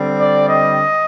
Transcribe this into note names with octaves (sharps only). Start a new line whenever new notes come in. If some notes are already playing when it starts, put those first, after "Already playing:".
Already playing: D3 G3 C4
D5
D#5